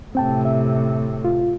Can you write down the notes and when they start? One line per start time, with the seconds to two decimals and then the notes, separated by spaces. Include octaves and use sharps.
0.15 A2 C3 C4 G5 A5
0.45 E5
1.25 F4